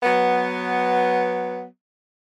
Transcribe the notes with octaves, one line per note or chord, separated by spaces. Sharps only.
F#3 B3